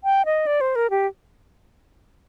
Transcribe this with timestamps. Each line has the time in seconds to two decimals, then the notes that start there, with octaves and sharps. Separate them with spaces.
0.04 G5
0.25 D#5
0.47 D5
0.61 C5
0.76 A#4
0.90 G4